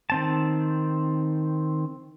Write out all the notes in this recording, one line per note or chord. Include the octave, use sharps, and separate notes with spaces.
D#3 C4 A5